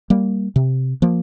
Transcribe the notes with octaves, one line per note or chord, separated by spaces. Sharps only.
G3 A#3
C3
F3 A#3